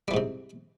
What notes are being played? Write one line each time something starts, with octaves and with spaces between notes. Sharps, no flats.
G#2 C3 E3 G3